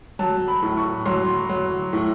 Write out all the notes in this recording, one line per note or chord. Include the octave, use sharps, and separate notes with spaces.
F#3 A5
B5
A2
C#6
F#3 C6
F#3
A2